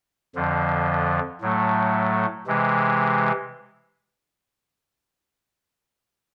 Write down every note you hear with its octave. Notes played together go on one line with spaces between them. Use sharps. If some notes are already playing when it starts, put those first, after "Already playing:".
F2 D3 F3
A2 F#3 A3
C3 E3 G#3